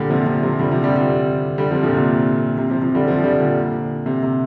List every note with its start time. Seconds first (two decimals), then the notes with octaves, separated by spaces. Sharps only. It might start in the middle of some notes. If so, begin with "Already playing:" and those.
Already playing: A#2 D3 G3
0.10 C3 F3
0.26 C3
0.43 C3 F3
0.59 D3 G3
0.71 C3 F3
0.84 D3 G3
0.96 D3 G3
1.58 D3 G3
1.71 C3 F3
1.83 A#2 D3
1.96 C3
2.58 C3
2.70 C3 F3
2.82 C3 F3
2.95 D3 G3
3.07 C3 F3
3.19 F3
3.23 D3 G3
3.40 A#2 D3
4.06 C3
4.23 C3